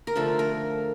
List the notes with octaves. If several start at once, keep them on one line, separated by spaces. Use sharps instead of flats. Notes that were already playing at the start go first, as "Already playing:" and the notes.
A#4
D3 F3 A3 A4
A#4